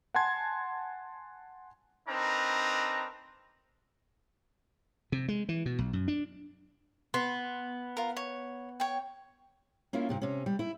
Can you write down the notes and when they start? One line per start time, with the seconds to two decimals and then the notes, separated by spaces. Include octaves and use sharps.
0.14 F#5 G#5 A5 C6 G#6
2.08 C4 D4 D#4 A#4 B4 A#5
5.12 C3
5.28 G#3
5.49 E3
5.66 B2
5.79 B1
5.93 F#2
6.08 D4
7.14 B3 C6
7.97 F4 A#4
8.17 C#5
8.80 C#5 G5
9.93 A#3 C#4 E4 F4 A#4
10.09 G2 C3 G4
10.22 C3 C#4
10.46 G3
10.59 E4